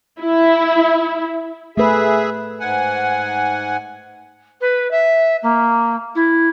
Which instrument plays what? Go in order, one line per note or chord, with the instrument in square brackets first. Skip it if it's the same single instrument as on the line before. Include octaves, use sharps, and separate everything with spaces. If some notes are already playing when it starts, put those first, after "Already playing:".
[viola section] E4
[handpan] A3 B4 [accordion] G#4 E5
[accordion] G#2 F#5 G#5
[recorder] B4
E5
A#3
E4